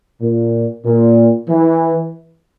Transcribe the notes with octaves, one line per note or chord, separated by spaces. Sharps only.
A#2
A#2
E3